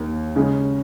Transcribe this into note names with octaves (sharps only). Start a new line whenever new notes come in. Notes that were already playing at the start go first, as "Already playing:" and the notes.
Already playing: D#2 D#3 A#3
C#3 G#3 C#4